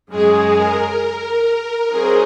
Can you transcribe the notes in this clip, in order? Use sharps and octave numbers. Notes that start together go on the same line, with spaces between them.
F#2 C#3 G#3 G#4
A#4
F#3 C4 D#4 G#4